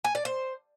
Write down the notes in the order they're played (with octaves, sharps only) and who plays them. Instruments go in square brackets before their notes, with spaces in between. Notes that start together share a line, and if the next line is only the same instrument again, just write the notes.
[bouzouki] G#5
D5
C5